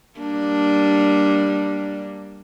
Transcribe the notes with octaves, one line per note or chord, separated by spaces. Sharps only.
G3 A#3 D4